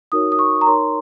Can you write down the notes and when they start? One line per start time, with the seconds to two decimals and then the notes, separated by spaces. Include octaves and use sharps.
0.12 D#4 F#4 A#4 C#5 D#6
0.32 D#6
0.39 C#6
0.61 A#5
0.67 D#4 A#4 C#5 C6